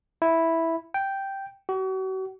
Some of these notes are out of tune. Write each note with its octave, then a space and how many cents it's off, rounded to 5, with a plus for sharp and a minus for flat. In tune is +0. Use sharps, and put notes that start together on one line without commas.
E4 -5
G5 -5
F#4 +40